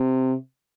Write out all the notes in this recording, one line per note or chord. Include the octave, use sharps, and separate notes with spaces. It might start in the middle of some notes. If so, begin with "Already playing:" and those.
Already playing: C3